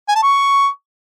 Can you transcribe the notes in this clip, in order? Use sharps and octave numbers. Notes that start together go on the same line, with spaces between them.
G#5
A5
C#6